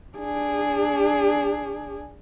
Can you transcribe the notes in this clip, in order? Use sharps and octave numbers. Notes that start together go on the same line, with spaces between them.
D4 G#4